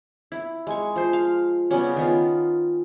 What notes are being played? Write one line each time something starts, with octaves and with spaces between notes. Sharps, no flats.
E4
G#3 C#6
F3 C5
F5
C#3 G3 B3 C#4
D#3 B3 F4